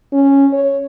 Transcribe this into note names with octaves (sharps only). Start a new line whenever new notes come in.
C#4
C#5